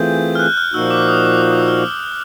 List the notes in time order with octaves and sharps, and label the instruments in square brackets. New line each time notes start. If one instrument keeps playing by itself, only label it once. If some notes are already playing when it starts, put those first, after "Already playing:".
Already playing: [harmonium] E3 A3 C4 F4 G#4 [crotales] G6
[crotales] F6
F#6
F6
[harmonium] A#2 F3 A#3 D#4 F#4 [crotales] E6
[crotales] D6
D#6
D6
D6
D#6
E6
F6